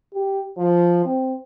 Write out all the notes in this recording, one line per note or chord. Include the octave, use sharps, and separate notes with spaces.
G4
F3
C4